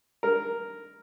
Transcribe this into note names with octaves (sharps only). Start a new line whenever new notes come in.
A#4